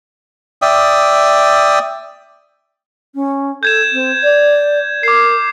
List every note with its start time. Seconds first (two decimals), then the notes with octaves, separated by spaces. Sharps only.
0.62 D5 E5 G5 D#6
3.15 C#4
3.63 A4 G6 G#6 E7
3.93 C4
4.23 D5
5.03 A#4 D6 C7